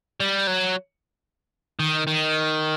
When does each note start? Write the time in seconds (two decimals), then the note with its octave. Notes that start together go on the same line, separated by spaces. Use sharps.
0.20 G3
0.47 F#3
1.79 D#3
2.07 D#3